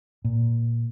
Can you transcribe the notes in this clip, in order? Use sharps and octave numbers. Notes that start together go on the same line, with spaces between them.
A#2